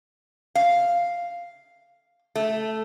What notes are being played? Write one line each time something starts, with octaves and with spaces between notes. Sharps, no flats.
F5
A3